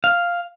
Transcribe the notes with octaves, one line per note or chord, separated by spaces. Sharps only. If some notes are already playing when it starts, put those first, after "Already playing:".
F5